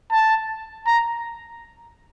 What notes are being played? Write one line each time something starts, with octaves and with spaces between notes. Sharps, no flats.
A5
A#5